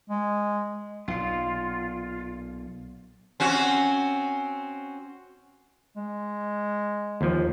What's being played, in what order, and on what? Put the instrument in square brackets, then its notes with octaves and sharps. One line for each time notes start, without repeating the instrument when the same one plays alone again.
[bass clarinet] G#3
[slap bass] B1 A#2 [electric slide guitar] F4
[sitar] C4 C#4 F#4
[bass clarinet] G#3
[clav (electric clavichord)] D#2 F3